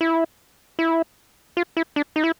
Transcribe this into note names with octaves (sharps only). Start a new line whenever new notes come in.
E4
E4
F4
E4
D4
D#4
E4